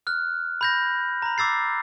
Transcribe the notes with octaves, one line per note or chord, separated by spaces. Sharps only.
F6 F#6
B5 G6 A#6
A#5 B5
D6 E6 A6 C7